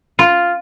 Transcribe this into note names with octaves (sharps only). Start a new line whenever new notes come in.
F4